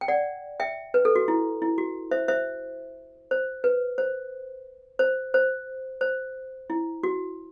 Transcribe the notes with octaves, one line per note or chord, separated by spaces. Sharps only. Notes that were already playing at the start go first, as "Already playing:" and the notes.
G5
D5 F#5
E5 G5
B4
A4
F#4
E4
E4
F#4
C5 E5
C5 E5
C5
B4
C5
C5
C5
C5
E4
F#4